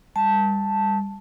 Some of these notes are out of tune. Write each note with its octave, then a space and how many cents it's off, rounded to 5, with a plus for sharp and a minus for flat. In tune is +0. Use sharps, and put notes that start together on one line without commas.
G3 +30 A5 +0